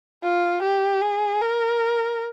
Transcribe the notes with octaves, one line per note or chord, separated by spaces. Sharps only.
F4
G4
G#4
A#4